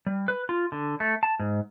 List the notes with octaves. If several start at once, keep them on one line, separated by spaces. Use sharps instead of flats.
G3
B4
F4
D3
A3
A5
G#2